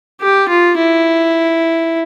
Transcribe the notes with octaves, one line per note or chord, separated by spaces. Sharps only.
G4
F4
E4